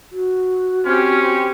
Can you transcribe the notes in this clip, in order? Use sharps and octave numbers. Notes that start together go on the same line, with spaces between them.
F#4
C4 C#4 G4